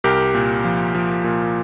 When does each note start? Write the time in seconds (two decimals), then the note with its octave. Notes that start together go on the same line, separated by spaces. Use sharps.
0.04 C2 G4 A#4
0.34 A#2
0.64 F3
0.94 F3
1.24 A#2